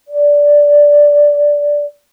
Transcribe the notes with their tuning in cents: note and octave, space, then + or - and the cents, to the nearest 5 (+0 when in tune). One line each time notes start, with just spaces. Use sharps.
D5 -10